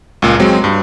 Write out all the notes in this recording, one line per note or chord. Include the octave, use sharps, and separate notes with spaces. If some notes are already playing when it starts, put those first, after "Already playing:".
C#2 A#2
F#3 G#3 C4
G2